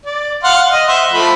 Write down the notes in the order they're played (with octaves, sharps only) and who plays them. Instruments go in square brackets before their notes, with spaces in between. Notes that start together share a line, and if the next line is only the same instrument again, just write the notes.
[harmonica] D5
F5 F#5 C6
D#5
C5 E5 F#5
F3 A3 B5